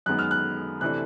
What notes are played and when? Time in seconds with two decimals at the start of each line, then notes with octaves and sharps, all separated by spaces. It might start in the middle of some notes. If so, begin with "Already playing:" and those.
0.06 F#2 D#3 G#3 B3 F#6
0.19 F6
0.31 F#6
0.81 C3 E3 A3 D4 F#6